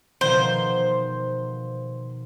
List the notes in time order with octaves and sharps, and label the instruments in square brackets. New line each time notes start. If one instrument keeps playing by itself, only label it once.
[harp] B2 D#3 F3 [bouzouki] C5